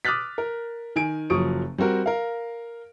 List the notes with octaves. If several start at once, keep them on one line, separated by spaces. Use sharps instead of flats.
D6 D#6 F6 F#6 A6 B6
A#4
D#3 G#5 D7
F#1 F3 F#3 C#6 D#6 D7
G3 C4 F#4 A#4
A#4 F5